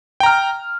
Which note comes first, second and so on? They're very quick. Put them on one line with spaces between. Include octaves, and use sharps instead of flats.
G5 A#5 F6